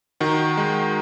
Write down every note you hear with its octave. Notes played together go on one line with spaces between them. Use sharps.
D#3 D#4 F#4
G#3